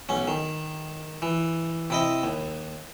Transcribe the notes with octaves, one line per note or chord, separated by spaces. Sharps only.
B1 C#4
D#3
E3
C3 E4 D#5
D#2